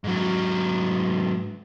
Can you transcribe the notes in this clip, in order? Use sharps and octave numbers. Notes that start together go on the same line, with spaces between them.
G#2 F#3